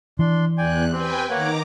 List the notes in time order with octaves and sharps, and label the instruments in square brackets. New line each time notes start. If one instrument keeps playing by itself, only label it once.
[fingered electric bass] E3 [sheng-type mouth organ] D4 C6
[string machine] E2 F#6 [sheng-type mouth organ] D5 G5 G#5
[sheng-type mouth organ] C4 G4 [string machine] B4 G5 G#5
[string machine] D#3 A#5 D6 [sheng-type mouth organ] A#3 C#5 F#5